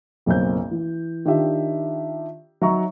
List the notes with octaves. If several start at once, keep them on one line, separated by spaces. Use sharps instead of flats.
F#1 B1 C4 G6
E3
D#3 D4 F4 G4 E5
F#3 D#4 E5 A#5 C#6